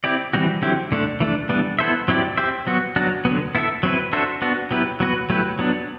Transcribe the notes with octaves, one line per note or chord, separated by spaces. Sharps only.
C4 E4 G4 D5
E3 G3 C4 F#4
D3 F#3 C4 E4 G4
D3 A3 D4
E3 A3 D4
E3 G3 B3 D4
B3 E4 A4 C5 E5
F#3 C4 E4 G4 D5
C4 G4 C5 E5
F#3 B3 F#4
F#3 B3 D4 F#4
D3 F#3 B3
B3 E4 A4 E5
F#3 C4 E4 B4
D4 F#4 A4 C5 E5
B3 D4 F#4
F#3 B3 E4 G4 B4
F#3 B3 F#4 B4
F#3 A3 E4 G4 B4
F#3 B3 D4